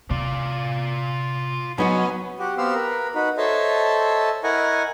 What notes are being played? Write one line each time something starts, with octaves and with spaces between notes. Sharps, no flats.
C3 F4 D5
F#3 B3 C#4 D#4 F#4
F#4 G4
B3 C4 G4 C5 F5 E6
A#4 B4
D#4 F#4 B4
A4 C5 C#5 D#5 E5 A5
E4 A#4 D#5 F#5 G#5 C#6